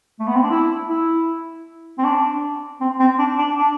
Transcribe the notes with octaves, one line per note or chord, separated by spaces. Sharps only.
A3
B3
C4
D4
E4
E4
C4
D4
C4
C4
D4
D4
D4